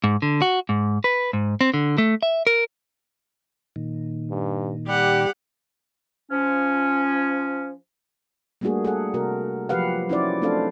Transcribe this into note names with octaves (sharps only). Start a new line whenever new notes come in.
G#2
D3
F#4
G#2
B4
G#2
C4
D3
A3
E5
A#4
A#2 D#3
G2
G3 G4 F#5
F3 C#4
G3 A3 A#3 D4 F#4 G#4
G#4 A4 F#5
C3 F#4 A#4
F3 F#3 G4 B4 F5 F#5
C#4 D#4 E4 F#4 C5 D5
A3 C4 D4 A4 C5 F5